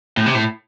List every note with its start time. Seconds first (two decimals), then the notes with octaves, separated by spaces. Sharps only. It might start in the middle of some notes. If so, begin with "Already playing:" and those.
0.17 A2
0.26 C3
0.35 A2